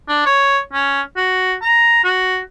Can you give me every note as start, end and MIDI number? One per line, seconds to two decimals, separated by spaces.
0.09 0.24 62
0.26 0.59 73
0.73 1.01 61
1.17 1.55 66
1.62 2.02 82
2.04 2.40 66